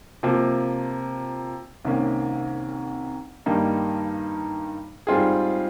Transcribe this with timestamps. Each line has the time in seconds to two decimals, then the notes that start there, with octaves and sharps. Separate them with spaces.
0.23 C3 F3 A#3
1.85 C2 C3 D#3 A#3 C#4
3.46 G2 D#3 G3 A#3 D#4
5.07 G#2 G3 C4 F4 G#4